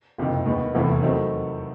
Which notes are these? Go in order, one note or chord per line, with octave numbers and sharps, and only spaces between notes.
F#1 F2 C3 D#3
D#2 D#3 G#3 B3
F1 E2 C3 E3 A3
D#3 F#3 A3 C4